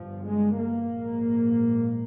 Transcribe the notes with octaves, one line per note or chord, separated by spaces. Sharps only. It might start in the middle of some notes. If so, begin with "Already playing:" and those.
Already playing: G1 G2 F3
G#3
A#3
A#1 G#2